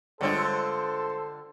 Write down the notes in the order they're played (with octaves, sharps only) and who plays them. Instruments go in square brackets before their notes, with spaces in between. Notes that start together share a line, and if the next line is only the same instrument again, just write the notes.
[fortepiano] G2 G#3 C#5 [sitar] D3 C4 F4 [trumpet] A4 [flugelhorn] C5